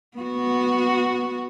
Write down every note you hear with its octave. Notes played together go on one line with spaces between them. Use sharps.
B3 F#4